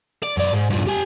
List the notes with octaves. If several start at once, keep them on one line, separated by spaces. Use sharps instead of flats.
D5
F#2 D5
G#2
G2 A#2
G4 G#5